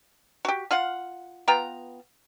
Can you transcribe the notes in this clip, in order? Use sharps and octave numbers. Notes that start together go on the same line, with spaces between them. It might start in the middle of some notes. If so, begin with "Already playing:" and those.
F#4 G4
F4 F5 F#5
B3 F4 G5 A#5